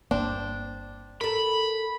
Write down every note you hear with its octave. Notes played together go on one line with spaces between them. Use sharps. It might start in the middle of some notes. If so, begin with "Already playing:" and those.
G1 E2 A#3 C4 D4
A4 A#4 B5